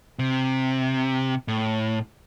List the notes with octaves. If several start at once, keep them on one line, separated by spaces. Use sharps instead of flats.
C3
A2